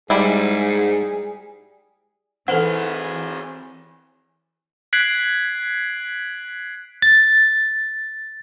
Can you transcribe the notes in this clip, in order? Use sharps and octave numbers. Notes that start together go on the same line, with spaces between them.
G#2 G3 G#3 E4 G#4
E3 C4 G#4 A4 B4 C5 F#5
F#6 G#6 B6 C7 D7 F#7
A6